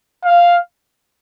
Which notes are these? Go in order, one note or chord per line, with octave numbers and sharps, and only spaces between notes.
F5